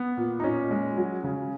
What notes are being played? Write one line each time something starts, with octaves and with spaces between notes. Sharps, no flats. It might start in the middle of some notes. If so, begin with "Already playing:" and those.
Already playing: B3
A#2
D#4
A#2 C#4
G#3
F#3
C#3